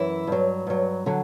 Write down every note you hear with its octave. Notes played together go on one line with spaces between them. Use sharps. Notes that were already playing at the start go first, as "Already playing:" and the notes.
Already playing: F#2 E3 E4
G2 F#3
G2 F#3
D3 F#3